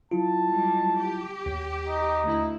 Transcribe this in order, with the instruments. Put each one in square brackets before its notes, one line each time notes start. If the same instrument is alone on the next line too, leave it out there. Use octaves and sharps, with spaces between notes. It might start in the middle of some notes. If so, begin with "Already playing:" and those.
[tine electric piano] F#3 E4 F4 [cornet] A5
[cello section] G3 G#3
G4
[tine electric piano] D#2
[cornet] D#4
[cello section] D2 E4